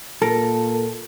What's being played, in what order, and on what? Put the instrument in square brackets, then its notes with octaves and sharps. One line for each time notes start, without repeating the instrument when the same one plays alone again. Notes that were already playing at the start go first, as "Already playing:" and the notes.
[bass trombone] A#2 [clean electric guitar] A4 [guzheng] A#4